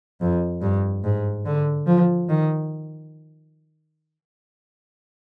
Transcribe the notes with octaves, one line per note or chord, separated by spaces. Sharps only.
F2
G2
G#2
D3
F3
D#3